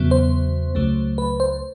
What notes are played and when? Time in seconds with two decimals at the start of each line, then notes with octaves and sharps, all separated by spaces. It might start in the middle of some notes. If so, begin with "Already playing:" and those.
Already playing: E2 C#3 F#3 B3
0.11 C5
0.75 C#2 C#3 F#3 A3
1.18 B4
1.40 C5